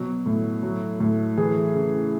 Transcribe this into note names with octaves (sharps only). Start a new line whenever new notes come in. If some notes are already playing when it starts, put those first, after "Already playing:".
Already playing: B2 F#3
A2
F#3
A2
E3 G#4
C#3